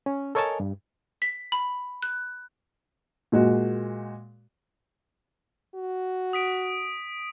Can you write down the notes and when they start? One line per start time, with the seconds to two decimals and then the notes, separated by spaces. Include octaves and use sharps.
0.06 C#4
0.35 A4 A#4 C#5 D#5 G#5 A5
0.60 G2
1.22 B6
1.52 B5
2.03 F#6
3.32 A#2 G#3 F#4
5.75 F#4
6.33 D#6 B6 D7